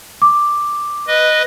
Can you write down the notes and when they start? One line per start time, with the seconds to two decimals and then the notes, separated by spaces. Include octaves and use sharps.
0.22 D6
1.08 B4 D#5